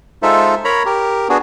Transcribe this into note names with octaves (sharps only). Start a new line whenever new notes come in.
G#3 D#4 F4 A4 C5 E5
A#4 C#5 A#5 B5
G4 A#4
B3 D4 F#4 G#4